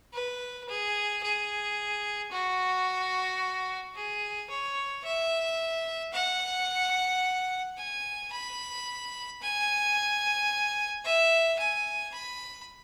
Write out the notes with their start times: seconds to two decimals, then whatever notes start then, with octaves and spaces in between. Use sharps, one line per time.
0.14 B4
0.69 G#4
1.23 G#4
2.32 F#4
3.95 G#4
4.50 C#5
5.05 E5
6.14 F#5
7.78 G#5
8.32 B5
9.42 G#5
11.05 E5
11.59 G#5
12.14 B5